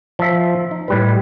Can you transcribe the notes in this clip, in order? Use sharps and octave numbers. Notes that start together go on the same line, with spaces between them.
F3 E5
D#4
A2 G3 B4